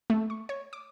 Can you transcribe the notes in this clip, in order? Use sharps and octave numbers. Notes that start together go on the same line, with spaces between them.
A3
C#6
C#5
D6